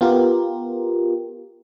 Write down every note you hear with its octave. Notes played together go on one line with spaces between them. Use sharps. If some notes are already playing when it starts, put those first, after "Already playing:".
B3 F4 G4 A#4